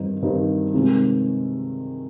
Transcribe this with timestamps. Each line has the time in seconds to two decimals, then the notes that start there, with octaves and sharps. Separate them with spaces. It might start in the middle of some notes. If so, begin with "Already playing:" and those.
Already playing: G2 D#3 G3 C4 D#4
0.22 G2 D#3 G3 C4 D#4
0.74 C3 D#3 G#3